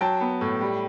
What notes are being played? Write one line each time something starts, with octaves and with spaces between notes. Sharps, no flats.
F#3 G5 A5
B3
A2
G3